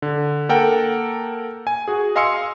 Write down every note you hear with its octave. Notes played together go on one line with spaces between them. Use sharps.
D3
A#3 A4 A#4 F#5 G5
G#5
F#4 G#4
D#5 F5 G#5 C6 E6 C#7